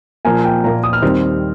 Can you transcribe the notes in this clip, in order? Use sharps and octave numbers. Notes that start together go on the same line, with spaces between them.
A#2 F3 A#3 G#5
G5
A#2 F3 A#3 A#5
D#6
F6
D#2 D#3 G3 C4